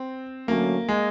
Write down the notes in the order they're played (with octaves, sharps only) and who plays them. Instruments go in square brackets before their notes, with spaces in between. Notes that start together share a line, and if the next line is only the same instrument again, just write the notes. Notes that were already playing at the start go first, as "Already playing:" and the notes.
Already playing: [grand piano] C4
[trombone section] D3 F#3 A3 C#4 [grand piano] A#3
[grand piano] G#3